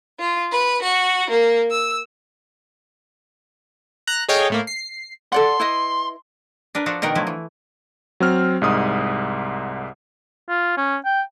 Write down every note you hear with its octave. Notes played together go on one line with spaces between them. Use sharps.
F4
B4
F#4
A#3
E6
A#5 F#6
G#4 A4 C#5 D#5 F5 G5
A2 A3 A#3
C7
A4 D5 F#5 C6
E4 B4 D#5
D4 A#4 B4
F3 D4 F#4 A4 A#5
B2 D#3 A#4 F#5 G5
D3 F3 F#3 A3 E4
E3
F#3 C4 F6
C2 G#2 D#6
F4
C#4
G5